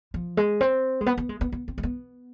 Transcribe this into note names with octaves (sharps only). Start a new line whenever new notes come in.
F3
G#3
C4
G#3
B3
B3
G#3
B3
B3
C4
G#3
B3